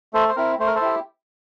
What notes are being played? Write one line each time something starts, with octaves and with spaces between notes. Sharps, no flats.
A3 A4 C5
C5
C4 E4 A#4
A3 C5
A#4
A4 C5
E4 G4